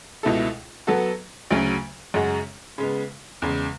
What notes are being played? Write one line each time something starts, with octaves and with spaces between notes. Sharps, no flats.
C#2 B2 A3 E4 A4
F#3 B3 F#4 A4
D2 C#3 F#3 C#4
F#2 C#3 G#3 C#4 F#4
C#3 G#3 B3
E2 C#3 G#3